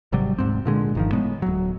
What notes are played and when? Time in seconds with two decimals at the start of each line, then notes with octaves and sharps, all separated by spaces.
0.12 G#1 C3 F#3 G3
0.38 D1 G#2 C4
0.65 A#2 D3 G#3
0.95 G1 D#3 F3
1.12 A2 G#3 B3
1.42 D1 F#3